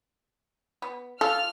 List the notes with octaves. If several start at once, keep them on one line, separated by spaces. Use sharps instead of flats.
B3
D4 F4 A4 F6